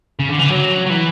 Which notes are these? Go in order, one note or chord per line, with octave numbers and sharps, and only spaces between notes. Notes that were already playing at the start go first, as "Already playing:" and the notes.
C#3
D3
E3
F#3
F#3
E3